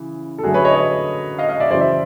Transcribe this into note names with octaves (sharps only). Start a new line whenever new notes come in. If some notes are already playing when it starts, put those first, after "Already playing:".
Already playing: C#3 E3
A4
F#2 D3 F#3 A3 F#4 G#4
B4 C#5
C#5 D#5
C#5 D#5
D#5 F5
D#5 F5
D5 E5
F#2 C#3 E3 C5 D5
D5 E5